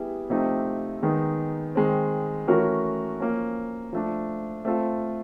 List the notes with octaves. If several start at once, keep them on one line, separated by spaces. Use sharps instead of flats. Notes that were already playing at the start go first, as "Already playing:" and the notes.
Already playing: G3 B3 E4 G#4
C3 F3 A3 C4 D#4
D#3 G#3 B3 D#4
D#3 G#3 C4
E3 A3 C#4 F#4 A#4
F3 A#3 C#4
F3 A3 D4
A3 C4 F4 A4